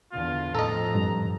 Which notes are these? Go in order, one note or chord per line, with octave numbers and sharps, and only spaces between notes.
E2 D3 F4
F2 A2 A4 D#5 A#5
G2